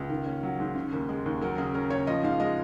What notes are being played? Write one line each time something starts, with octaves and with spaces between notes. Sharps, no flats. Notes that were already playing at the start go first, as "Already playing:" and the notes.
Already playing: C#2
D#3
C#4
F#3
G#2
C#3
D#2
G#3
D#2
F#3 A#4
C#3 G#4
C#4 A#4
C#3 C#5
F3 D#5
G#2 F5
G#3 D#5